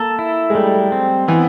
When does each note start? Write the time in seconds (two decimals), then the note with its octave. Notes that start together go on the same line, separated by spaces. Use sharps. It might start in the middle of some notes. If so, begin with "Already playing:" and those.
Already playing: A#3 A4
0.19 E4
0.50 G#3
0.55 G3 A3
0.92 C4
1.28 E3 B3